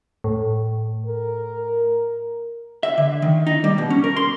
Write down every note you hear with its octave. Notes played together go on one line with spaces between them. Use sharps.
A2
A#4
E5
D3
D#3
D#4
G3
B2
C#4
A#4
C6